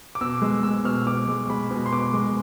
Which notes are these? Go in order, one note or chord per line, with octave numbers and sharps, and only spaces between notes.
D6
B2 E6
G#3
G#3 E6
B2 F6
B2 D6
G#3
G#3 B5
B2
C6
B2 D6
G#3